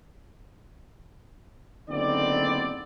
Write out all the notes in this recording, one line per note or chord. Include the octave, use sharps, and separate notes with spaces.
F#1 D3 B3 C4 D#4 D5